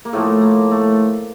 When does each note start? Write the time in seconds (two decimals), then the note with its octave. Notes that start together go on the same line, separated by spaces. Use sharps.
0.05 A#3
0.13 A2 F3 A3
0.41 A#3
0.71 A3